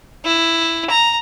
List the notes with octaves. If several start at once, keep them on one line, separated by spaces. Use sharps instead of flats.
E4
A#5